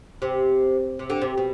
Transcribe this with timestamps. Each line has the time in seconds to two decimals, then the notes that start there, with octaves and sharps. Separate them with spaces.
0.22 C3
0.99 C3
1.10 D3
1.22 C3
1.38 B2